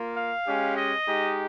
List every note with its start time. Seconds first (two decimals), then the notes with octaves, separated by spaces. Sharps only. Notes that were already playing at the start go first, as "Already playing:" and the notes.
Already playing: A#3 F4
0.15 F5
0.45 G#3 C#4 G4
0.75 D#5
1.06 G#3 D#4 G4